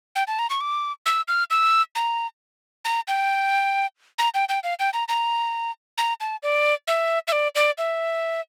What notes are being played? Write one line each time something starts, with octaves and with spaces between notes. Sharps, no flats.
G5
A5
A#5
C#6
D6
E6
F6
E6
A#5
A#5
G5
A#5
G5
G5
F5
G5
A#5
A#5
A#5
A5
D5
E5
E5
D5
D5
E5